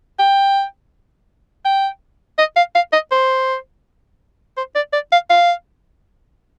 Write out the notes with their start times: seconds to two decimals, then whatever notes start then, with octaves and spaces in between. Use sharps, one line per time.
0.19 G5
1.65 G5
2.38 D#5
2.56 F5
2.75 F5
2.93 D#5
3.11 C5
4.57 C5
4.75 D5
4.93 D5
5.12 F5
5.30 F5